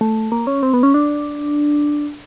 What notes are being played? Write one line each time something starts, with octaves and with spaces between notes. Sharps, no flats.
A3
A#3
C#4
C4
B3
C#4
D4